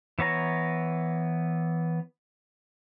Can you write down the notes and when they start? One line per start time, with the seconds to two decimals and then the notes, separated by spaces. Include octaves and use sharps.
0.19 E3 B3 C#5 A#5